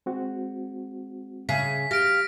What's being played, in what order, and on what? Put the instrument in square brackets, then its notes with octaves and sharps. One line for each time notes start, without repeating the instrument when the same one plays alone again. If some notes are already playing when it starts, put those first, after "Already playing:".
[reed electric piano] G#3 C4 F#4
[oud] C#3 G#4 [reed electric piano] E5 [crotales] B6
[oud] G4 [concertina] F5 [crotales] A#6 D7